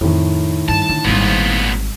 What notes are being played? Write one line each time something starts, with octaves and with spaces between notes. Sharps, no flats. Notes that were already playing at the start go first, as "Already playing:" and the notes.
F2 A2 D#3
G2 A5
D3
G#1 A#2 G3 B3